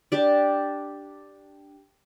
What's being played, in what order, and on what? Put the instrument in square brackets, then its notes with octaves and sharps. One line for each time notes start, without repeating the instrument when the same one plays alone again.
[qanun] D4 G4 D5